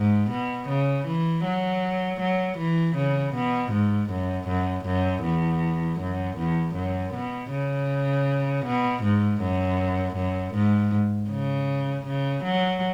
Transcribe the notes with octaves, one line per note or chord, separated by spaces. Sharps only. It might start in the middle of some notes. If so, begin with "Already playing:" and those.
Already playing: G#2
B2
C#3
E3
F#3
F#3
E3
C#3
B2
G#2
F#2
F#2
F#2
E2
F#2
E2
F#2
B2
C#3
B2
G#2
F#2
F#2
G#2
C#3
C#3
F#3